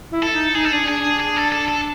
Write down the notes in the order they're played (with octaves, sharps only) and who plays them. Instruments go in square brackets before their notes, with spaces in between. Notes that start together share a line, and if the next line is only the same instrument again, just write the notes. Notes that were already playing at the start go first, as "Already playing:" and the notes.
[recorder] E4
[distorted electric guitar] A4
[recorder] D#4
[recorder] D#4 [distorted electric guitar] G#4
[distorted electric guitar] A4
[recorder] D4 [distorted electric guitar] G#4
[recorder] D4 [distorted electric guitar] G#4
[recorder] D4
[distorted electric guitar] G#4
A4
A4
A4